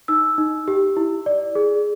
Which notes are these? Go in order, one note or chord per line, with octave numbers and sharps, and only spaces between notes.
D#4 E6
D#4
G4
E4
D5
G#4